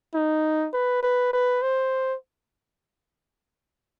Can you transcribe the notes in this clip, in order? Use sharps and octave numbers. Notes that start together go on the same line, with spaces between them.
D#4
B4
B4
B4
C5